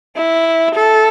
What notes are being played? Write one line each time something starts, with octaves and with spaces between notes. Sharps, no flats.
E4
A4